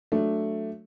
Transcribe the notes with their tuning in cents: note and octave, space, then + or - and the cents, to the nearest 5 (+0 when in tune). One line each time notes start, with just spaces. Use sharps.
F#3 +0 A3 +0 D4 +0